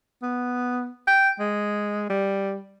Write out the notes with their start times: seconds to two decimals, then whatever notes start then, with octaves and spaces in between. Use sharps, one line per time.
0.22 B3
1.07 G5
1.40 G#3
2.10 G3